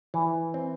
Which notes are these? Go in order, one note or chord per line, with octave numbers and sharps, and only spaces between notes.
E3
C4